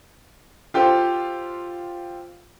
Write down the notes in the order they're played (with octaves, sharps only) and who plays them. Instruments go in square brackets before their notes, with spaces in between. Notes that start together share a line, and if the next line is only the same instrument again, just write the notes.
[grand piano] F4 G4 A4 C5